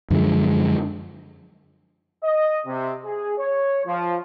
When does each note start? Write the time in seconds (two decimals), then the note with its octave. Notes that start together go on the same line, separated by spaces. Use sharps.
0.11 F#2 D3 F3 G#3
2.23 D#5
2.66 C3
3.04 G#4
3.38 C#5
3.85 F3